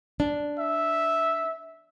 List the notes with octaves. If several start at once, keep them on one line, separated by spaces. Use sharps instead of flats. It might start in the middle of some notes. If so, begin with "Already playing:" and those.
D4
E5